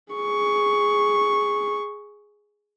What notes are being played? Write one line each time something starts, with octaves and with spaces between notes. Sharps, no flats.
G#4 C#6